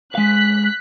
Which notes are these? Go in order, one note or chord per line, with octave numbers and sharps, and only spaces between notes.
G#3 F5 F#6 B6